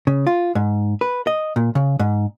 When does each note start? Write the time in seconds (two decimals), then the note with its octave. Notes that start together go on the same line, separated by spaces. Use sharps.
0.07 C#3
0.27 F4
0.55 G#2
1.01 B4
1.27 D#5
1.56 A#2
1.75 C#3
1.99 G#2